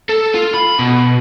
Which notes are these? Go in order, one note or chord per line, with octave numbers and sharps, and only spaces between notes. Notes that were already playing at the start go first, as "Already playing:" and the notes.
A4
F4
B5
B2